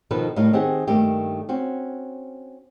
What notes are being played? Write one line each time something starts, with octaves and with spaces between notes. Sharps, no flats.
B2 D#3 F3 D#4 A4 B4
A2 G3 D#4 A#4 D#5 F5
D#3 C4 G4 G#4 D#5 F#5
G2 D#3 A3 A#3 G4
C4 C#4 F#4